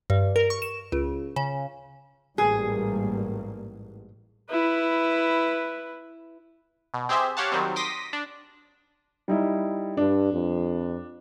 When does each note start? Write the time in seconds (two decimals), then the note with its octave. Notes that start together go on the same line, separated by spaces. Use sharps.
0.10 G2
0.36 A#4
0.50 C#6
0.62 E7
0.92 C#2
1.36 C#3
2.38 A1 G#2 G3 A#3 G#4
4.50 E4 B4
6.94 B2
7.09 C4 G4 G#4 C5 E5
7.37 G4 C#5 F5 F#5 A5
7.52 D#3 F#3 G3 C4
7.76 C6 D6 D#6 A#6 B6
8.13 D4
9.28 G3 D#4 E4
9.97 G2 D4
10.32 F2